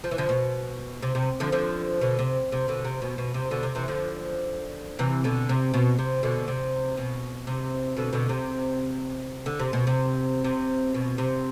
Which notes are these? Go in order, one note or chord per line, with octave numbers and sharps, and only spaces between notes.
F3
E3
D3 F3
B2
C3
C3
D3 F3
D3 F3
B2 D3
C3
C3
B2 D3
C3
B2
B2
C3
B2 D3
C3
C3 E3
D3 F3
C3 E3
B2 D3
C3
B2
C3
B2 D3
C3
B2
C3
B2 D3
B2 D3
C3
D3
C3
B2
C3
C3
B2
C3